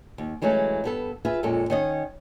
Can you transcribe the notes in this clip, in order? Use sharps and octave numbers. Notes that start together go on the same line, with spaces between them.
D#2
E3 F#3 G#3 A3 C#4
G2 B3 A4
F4 G#4 B4 E5
F2 A#2 G#3 C#4 A4
D#3 C#4 D#5